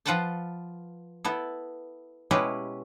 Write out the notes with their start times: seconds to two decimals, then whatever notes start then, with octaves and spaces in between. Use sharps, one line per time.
0.06 F3 F4 B4 F#5 G5 A5
1.25 B3 E4 A4
2.31 B2 G#3 C#4 E4 G4 B4